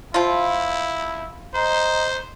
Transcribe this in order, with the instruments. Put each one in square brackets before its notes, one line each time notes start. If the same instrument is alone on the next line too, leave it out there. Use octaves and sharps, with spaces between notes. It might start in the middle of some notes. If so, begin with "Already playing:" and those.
[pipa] F3 F4 [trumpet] E4
[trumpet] C5 [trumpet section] D#5 A#5